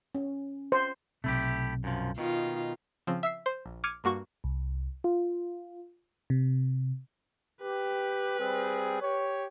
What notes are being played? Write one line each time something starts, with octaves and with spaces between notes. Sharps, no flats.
C#4
C5
B1 C3 A3 E4 G4
F#2 F3
B2 D#3 F4
C#3 F3 C4
E5 E6 C7
C5
A#1
D6 F6 G#6 C#7 D#7
G2 A#3 F#4 C#6
C2
F4
C3
G4 B4
G3 C4 G#4
G4 C#5